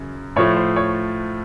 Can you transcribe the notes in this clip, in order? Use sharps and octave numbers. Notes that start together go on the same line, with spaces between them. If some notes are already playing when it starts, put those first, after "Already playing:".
Already playing: F#2 C#3
A2 F3 A3 C#5
C5
C#5